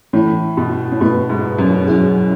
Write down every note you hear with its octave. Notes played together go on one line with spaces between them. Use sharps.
A2 E3 A3 E4
B2
A2
B2 A3 E4 B4
G#2
F#2
F#3 C#4 E4 G#4